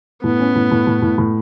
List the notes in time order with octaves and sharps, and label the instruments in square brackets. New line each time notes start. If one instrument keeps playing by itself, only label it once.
[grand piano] A2 [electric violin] B3
[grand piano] C#4
A2
A2
A2
A2
A2